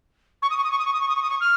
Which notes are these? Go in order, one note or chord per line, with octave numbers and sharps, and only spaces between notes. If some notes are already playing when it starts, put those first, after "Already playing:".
C#6
D#6
C#6
D#6
C#6
D#6
C#6
D#6
C#6
D#6
C#6
D#6
C#6
F6